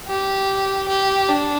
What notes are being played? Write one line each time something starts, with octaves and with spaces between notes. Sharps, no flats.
G4
G4
D4